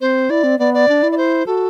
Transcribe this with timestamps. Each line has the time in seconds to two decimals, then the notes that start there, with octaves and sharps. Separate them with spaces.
0.01 C4 C5
0.30 E4 D5
0.44 C4
0.59 B3 D5
0.74 D5
0.88 D4
1.03 E4
1.11 D5
1.17 C5
1.46 F#4 A4